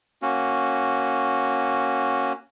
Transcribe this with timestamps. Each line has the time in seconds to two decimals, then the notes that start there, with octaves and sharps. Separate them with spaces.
0.22 A#3 C#4 F#4